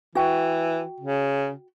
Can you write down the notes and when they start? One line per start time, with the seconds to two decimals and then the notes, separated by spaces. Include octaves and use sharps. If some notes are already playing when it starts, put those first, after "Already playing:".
0.15 E3 F#4 G5
1.00 C#3